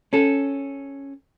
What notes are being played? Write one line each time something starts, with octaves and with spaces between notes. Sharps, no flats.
C#4 A4